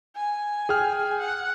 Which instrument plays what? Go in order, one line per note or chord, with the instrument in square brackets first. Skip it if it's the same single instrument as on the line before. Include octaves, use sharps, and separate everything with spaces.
[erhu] G#5
[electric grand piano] G#4 G5 F6
[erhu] F#5